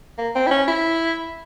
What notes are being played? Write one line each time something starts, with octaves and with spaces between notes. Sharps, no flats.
A#3
C4
E4
C#4
E4